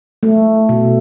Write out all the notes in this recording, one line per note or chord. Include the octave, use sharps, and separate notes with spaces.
A3
B2